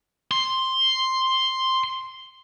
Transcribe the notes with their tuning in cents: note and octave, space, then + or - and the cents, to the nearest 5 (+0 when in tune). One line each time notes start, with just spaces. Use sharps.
C6 +5